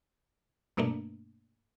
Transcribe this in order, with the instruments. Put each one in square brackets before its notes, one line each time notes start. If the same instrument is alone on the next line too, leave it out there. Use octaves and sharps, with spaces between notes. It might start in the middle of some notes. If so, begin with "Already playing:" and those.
[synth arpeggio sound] G2 B2 A3 A#3 D4